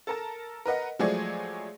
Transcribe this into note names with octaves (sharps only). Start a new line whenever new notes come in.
A4 A#4 A5
A#4 B4 D#5 F#5
F3 F#3 G#3 A3 G#4 D5